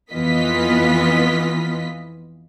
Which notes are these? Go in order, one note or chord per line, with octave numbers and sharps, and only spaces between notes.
F2 E3 B3 F4 D#5 B6